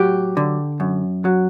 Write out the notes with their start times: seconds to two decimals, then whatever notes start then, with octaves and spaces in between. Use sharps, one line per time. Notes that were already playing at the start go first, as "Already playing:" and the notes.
Already playing: A2 F#3 G4
0.37 D3
0.80 F#2
1.25 F#3